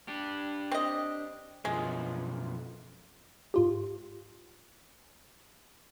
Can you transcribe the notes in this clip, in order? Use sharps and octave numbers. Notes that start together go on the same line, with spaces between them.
D4 G4
C4 D#5
B1 F#2 F3 G#3
G#2 F4 G4